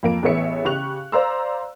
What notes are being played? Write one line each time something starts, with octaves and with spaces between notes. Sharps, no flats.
F2 A#3 D7
A1 B3 G#4 C#5 E5 C#7
C#3 G4 C#6 F#6 F7
C5 D5 F5 A#5 C6 E6